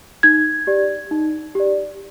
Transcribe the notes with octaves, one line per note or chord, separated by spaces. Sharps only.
D#4 G#6
G4 D5
D#4
G4 D5